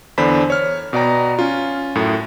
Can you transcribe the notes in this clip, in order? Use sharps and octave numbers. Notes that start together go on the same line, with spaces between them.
E2 D3 D4 C5 B5 B6
C#5 F6
B2 B3 D5 G5 A#5
C#4 F4
F#2 A2